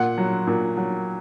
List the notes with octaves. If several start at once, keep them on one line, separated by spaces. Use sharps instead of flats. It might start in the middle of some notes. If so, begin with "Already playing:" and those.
Already playing: A#2 F#5
F#3
A#2
F#3